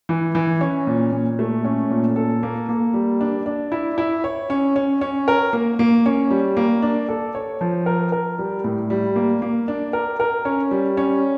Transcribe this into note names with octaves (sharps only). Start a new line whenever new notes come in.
E3
E3
C#4
A#2
A#2
A3
C#4
A#2
A4
A#3
A#3
G3
D4
D4
E4
E4
C#5
C#4
C#4
C#4
A#4
A#3
A#3
C#4
G3
A#3
D4
A4
C#5
F3
A#4
A#4
G3
A2
G3
A#3
A#3
D4
A#4
A#4
C#4
G3
C#4